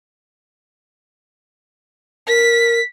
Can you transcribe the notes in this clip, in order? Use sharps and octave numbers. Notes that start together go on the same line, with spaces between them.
A#4 B6